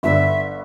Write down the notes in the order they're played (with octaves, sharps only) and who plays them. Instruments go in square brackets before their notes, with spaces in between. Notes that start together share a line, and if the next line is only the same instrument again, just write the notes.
[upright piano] G1 G2 D3 [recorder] E5